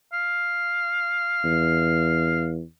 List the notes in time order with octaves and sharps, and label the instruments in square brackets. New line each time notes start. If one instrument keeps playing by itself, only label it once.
[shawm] F5
[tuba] E2